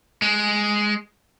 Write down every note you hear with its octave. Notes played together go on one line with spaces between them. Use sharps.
G#3